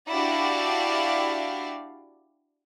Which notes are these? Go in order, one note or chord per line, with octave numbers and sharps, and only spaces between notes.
D4 E4 F#4 G4 D5 F5